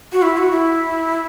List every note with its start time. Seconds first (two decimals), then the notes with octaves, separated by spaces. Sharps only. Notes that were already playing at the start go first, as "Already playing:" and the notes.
0.13 F#4
0.22 E4
0.38 F#4
0.51 E4